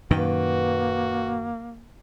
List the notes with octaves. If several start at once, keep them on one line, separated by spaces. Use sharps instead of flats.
F#2 A#2 D#3 A#3 F#4 B4 G5